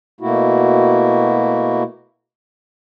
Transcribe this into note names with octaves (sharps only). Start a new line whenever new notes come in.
B2 A3 A#3 E4 F#4